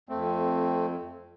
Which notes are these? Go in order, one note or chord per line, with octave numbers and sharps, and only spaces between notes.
F2 A3 C4